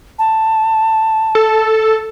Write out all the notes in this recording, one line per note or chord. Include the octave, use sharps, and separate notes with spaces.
A5
A4